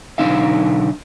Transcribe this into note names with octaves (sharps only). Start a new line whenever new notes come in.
B1 D3 D#3 D#4 E5 F5